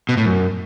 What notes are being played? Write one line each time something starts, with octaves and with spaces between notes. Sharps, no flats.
B2
A2
F#2